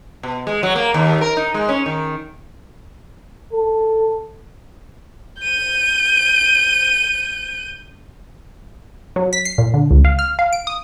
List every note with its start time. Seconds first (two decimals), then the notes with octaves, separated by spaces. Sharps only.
0.23 B2
0.47 G#3
0.63 F#3
0.75 A#3
0.94 D#2
1.21 A#4
1.37 D#4
1.54 G#3
1.69 C#4
1.86 D#3
3.53 A4
5.41 G6 D#7
9.16 F#3
9.33 B6
9.45 C7
9.58 A#2
9.74 D3
9.91 C#2
10.05 F5
10.19 F6
10.39 F5
10.53 D7
10.67 D#6